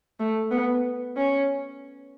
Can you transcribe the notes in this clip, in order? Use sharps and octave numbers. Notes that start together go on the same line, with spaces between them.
A3
B3
C#4